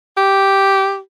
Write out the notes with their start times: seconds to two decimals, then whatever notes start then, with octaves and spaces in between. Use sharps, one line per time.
0.17 G4